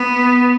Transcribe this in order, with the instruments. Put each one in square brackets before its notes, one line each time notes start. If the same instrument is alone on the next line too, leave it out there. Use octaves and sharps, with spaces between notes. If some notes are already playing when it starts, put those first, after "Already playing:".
Already playing: [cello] B3